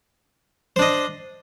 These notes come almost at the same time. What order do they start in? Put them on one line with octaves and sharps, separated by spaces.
C5 D4 D#5